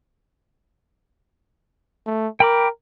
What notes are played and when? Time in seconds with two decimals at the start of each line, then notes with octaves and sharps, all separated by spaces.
2.06 A3
2.40 A#4 G5 B5 D6